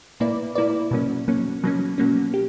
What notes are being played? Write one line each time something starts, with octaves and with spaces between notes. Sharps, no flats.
A#2 A#3 E4 B4 D5
A#2 A#3 E4 B4 D5
B2 F#3 A#3 C#4
B2 F#3 A#3 C#4
B2 F#3 A#3 C#4
B2 F#3 A#3 C#4
G4